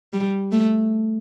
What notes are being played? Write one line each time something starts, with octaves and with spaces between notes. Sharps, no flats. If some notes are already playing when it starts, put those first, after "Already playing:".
G3
A3